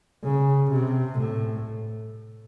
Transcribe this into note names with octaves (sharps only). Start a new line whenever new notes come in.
C#3
C3
A2